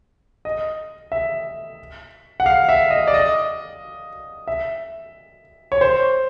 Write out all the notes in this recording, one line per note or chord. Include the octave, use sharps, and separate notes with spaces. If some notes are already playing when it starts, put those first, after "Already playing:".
D#5
E5
F#5
F5
E5
D#5
D5
D#5
E5
C#5
C5